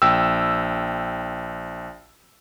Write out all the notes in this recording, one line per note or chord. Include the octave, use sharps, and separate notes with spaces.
A#1 G5 E6